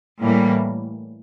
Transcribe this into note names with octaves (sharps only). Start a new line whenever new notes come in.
A2 E3 G3 A#3